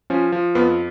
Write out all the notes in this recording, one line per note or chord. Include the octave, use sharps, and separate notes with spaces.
F3 C#4
F3
F2 B3